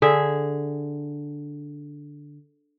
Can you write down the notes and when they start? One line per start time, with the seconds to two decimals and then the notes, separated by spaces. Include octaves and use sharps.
0.02 D3 G#4 E5